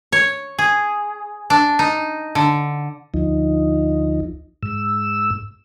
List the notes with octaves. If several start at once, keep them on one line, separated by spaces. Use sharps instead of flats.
C#5
G#4
D4
D#4
D3
D2 F3 D#4
G#2 E6